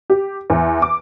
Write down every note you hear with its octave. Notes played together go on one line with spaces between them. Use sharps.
G4
E2
D6